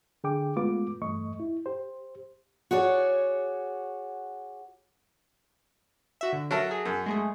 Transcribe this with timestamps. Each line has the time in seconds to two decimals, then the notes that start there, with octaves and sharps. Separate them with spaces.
0.24 D3 G#4 G5 D6
0.56 G#3 A3 B3 F4 B4 D6
1.02 E2 G2 A3 D#5 C#6
1.40 E4
1.66 G4 C5
2.71 F#4 G#4 C#5 D5
6.21 F#4 E5
6.33 D3
6.51 F#3 A4 A#4 E5
6.71 G#4
6.85 F#2
7.06 G#3 A3 G#4